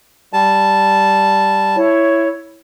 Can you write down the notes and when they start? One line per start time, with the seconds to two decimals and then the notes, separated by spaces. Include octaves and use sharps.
0.33 G3 A5
1.76 E4 C#5